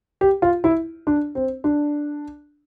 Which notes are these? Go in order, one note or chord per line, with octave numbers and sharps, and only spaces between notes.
G4
F4
E4
D4
C4
D4